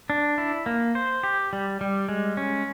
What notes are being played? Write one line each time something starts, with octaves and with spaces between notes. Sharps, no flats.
D4
E4
A#3
C5
G4
G3
G3
G#3
C#4